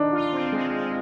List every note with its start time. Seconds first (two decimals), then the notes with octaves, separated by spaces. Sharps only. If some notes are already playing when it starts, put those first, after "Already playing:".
Already playing: D4 D#4
0.12 F4
0.33 C4
0.52 G#3
0.73 G#3